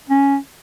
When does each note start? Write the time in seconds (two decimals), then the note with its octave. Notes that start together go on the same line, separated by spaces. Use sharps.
0.10 C#4